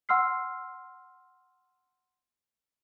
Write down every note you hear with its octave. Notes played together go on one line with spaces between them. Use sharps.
F#5 C6 E6 F6 C7